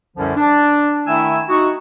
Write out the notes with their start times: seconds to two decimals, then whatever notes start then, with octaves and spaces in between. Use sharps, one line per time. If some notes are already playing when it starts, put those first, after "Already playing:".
0.17 C2 F#2 D3 F3 G3 C#4
0.36 D4
1.07 D#3 A3 E4 G#5 E6
1.49 D#4 F#4